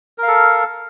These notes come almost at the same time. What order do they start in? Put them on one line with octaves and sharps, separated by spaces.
A#4 F5 A4